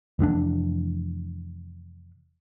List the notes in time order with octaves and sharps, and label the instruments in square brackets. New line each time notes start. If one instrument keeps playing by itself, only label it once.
[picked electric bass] F1 E3 C4 D4